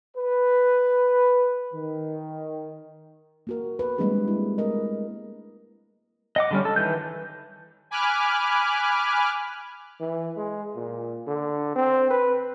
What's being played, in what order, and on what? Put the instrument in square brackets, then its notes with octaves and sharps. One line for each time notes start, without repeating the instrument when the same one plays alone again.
[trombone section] B4
D#3
[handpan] A#3 F#4 A#4
B4
G3 G#3 A#3 C4 D4 G#4
E4
A3 A#4 D#5
[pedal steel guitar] D#5 F#5 D6
D3 G3 C#4
A4
D#3 E3 B4 G6
[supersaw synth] G#5 B5 D6 F6 F#6
[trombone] E3
G#3
A#2
D3
C4
B4